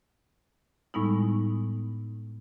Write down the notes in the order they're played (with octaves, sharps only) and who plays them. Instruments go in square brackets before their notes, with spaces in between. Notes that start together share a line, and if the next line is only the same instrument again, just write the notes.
[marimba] A2 G3 G#3 B3 D#4 E4